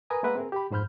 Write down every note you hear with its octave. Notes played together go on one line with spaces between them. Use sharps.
A#4 B4 G#5 A#5 D#6
G#3 A#3 A#4 B4 E5 F#5
C4 G#4 A#4
G4 B5
F2 G#2 C5 B5 F6 G6